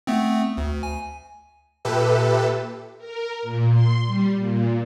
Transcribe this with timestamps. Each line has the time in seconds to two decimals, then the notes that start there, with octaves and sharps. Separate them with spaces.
0.07 A3 B3 C4
0.57 D2
0.83 G#5
1.85 A#2 G4 A4 B4 E5
2.98 A#4
3.42 A#2
3.72 C6
4.06 G3
4.37 A#2